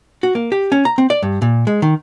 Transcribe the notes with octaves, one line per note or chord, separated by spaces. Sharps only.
F#4
A#3
G4
C#4
A#5
C4
D5
G2
A#2
G#3
D#3